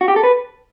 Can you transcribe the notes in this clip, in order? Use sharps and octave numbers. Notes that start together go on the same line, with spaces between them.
F#4
G4
A4
B4